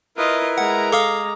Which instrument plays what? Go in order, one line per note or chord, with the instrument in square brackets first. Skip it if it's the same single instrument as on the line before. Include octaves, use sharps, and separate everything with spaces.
[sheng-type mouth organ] E4 A#4 B4 [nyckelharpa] F4 D#5
[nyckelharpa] G#3 A#5 [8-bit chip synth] F#5
[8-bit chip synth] A4 F5 [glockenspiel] D6 D#6 F6